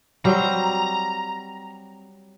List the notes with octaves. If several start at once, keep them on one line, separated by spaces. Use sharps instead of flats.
F#3 G3 C4 A#5